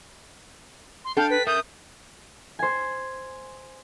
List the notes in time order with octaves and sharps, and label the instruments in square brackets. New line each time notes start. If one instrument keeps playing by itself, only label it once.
[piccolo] C6
[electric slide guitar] D4 [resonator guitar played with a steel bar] A4 G5 [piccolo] F5
[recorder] B4 [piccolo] B6
[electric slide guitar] A#4 E5 [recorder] D#6 [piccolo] G6
[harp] C5 G#5